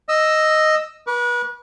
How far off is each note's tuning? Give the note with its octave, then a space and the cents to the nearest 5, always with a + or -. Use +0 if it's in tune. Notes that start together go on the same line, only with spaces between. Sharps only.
D#5 +0 E6 +0
B4 -30 D6 -40